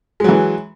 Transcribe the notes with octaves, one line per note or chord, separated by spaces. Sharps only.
E3 F#3 G#3